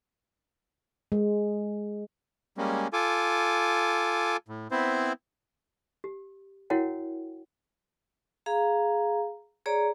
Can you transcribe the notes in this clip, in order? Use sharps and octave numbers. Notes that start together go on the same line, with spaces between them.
G#3
G3 G#3 A#3 C#4
F4 A4 G#5 D6
A2
B3 C4 E4 C5
G4
E4 F#4 A#4 C#5 F#5 G5
G#4 F5 A#5
G#4 C#5 D5 A#5